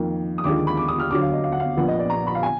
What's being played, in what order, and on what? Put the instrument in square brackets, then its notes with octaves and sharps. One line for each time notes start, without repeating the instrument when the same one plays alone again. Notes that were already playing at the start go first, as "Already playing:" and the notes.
Already playing: [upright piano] F2 D#3 A#3
D#6
D#2 D3 F3 G#3 D6
B5
D6
D#6
F6
D2 D3 F#3 D6
F5
D#5
F5
F#5
F5
A#1 A#2 F3 B3 F#5
D#5
D5
A#5
B5
F5
G#5